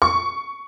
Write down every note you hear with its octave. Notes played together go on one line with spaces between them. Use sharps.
C#6